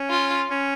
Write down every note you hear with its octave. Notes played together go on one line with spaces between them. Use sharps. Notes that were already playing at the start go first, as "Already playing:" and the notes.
Already playing: C#4
F4
C#4